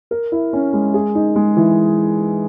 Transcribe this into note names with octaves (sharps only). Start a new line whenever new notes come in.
A#4
E4
C#4
G#3
G#4
D#4
G#3
E3